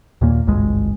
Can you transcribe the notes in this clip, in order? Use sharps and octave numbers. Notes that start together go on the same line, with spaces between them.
D#2 A#2 A#3
G#1 C#2 G2 G#3